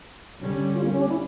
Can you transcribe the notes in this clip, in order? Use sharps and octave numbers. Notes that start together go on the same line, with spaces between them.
D3 G3 C#4
F4
A#3
C#4
D4
E4